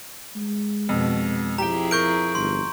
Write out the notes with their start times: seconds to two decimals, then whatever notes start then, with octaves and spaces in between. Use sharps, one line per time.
0.36 G#3
0.89 F2 B2
1.58 F2 E4 G4 G#4 G5 A#5
1.91 A#4 C#6 G6 D7
2.35 G1 C6